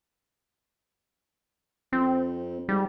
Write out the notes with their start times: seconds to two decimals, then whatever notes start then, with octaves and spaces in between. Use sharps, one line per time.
1.93 F2 C4
2.69 G#2 G3